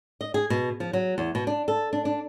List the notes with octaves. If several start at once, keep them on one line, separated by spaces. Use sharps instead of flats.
D#5
G#4
B2
F3
F#3
E2
B2
D4
A4
D4
D4